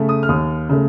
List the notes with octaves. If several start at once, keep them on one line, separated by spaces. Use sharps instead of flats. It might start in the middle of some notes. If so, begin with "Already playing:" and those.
Already playing: C#3 A3
D#6
F6
D#2 D#6
C#3 A3